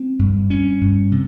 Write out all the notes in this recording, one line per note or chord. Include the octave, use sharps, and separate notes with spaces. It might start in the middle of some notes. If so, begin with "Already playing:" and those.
Already playing: C4
G2
G2 C#4
G2
C3